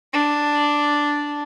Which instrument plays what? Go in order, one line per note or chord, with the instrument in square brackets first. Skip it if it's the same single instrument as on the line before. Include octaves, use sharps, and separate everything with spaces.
[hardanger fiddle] D4